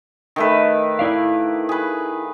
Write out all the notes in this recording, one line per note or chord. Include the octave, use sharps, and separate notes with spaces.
D#3 A3 B4
E4 D5 F5
G#4 B4